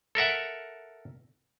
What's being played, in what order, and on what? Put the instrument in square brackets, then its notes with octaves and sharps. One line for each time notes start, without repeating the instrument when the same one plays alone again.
[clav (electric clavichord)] A4 A#4 E5 F#5